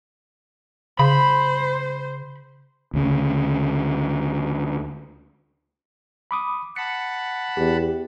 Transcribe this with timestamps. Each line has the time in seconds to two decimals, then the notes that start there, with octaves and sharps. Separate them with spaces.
0.99 C#3 C5 B5
2.94 D2 C#3
6.31 B5 D6 D#6
6.76 F#5 A5 B5 C#7
7.57 E2 G4